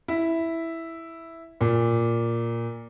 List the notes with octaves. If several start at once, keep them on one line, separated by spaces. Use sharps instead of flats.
E4
A#2